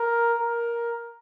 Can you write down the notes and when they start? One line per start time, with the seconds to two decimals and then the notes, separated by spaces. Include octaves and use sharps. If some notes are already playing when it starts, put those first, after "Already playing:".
Already playing: A#4
0.39 A#4